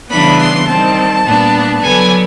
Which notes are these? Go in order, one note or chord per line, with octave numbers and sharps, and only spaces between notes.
C#3 E3 G3 B3 D4 B5
C6
D#3 G3 C4 A5
A#2 G3 B3 D4
D3 F#3 B3 G#5